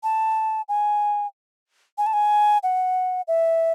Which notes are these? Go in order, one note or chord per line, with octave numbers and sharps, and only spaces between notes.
A5
G#5
G#5
A5
G#5
F#5
E5